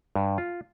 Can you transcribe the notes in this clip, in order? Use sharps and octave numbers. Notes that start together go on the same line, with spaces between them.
G2
F4